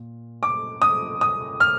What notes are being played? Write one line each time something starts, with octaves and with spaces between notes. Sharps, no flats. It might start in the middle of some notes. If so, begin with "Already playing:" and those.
Already playing: A#2
D6
D#6
D#6
F6